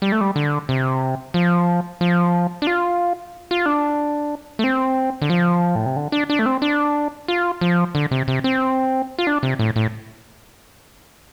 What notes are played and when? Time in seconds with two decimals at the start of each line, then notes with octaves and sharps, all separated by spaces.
0.02 G3
0.12 A3
0.21 G3
0.36 D3
0.69 C3
1.34 F3
2.01 F3
2.62 D4
2.67 F4
3.51 F4
3.66 D4
4.59 A3
4.64 C4
5.22 D3
5.30 F3
5.75 A2
5.86 C3
5.96 D3
6.12 D4
6.30 D4
6.39 A3
6.46 C4
6.62 D4
7.28 F4
7.61 F3
7.95 D3
8.11 C3
8.28 C3
8.44 C4
9.19 F4
9.27 D4
9.43 C3
9.59 A2
9.76 A2